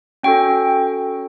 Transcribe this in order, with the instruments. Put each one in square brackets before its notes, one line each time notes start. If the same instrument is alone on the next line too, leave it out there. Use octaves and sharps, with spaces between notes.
[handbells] C#4 F#4 A4 G5